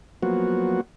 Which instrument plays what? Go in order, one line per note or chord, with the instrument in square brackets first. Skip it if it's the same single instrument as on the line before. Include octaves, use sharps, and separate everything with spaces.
[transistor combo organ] F3 F#3 A#3 B3 F#4